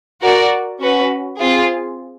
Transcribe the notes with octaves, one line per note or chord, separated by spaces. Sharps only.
F#4 A#4 D5
C#4 F#4 B4
C4 F4 G#4